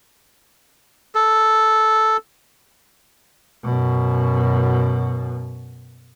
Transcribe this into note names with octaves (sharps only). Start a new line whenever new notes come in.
A4
F#2 B2